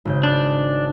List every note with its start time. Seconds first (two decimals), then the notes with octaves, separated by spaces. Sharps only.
0.05 G#1 C#3 G6
0.23 D4